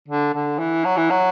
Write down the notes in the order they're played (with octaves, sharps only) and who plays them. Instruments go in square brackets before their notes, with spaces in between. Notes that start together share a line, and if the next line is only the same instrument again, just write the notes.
[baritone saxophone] D3
D3
E3
F#3
E3
F#3